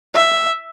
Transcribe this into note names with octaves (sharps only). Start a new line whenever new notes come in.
E5